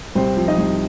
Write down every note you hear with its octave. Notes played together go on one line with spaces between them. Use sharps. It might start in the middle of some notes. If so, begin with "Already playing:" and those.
C2 C4 C5
F3
D#4 D#5
C2